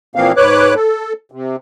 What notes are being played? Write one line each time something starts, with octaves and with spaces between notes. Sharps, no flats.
A#2 E3 F3 A#3 C4 F5
G#2 B4 C#5 D6 F#6
A4
C3